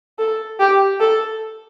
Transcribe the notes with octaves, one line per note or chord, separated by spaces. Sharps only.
A4
G4
A4